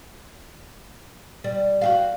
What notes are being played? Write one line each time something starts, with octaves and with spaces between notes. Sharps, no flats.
G3
F#4 G4 F5